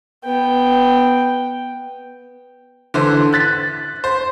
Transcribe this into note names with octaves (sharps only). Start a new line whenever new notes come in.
B3 G5
D3 E3 C5
F#6 A6 B6
C5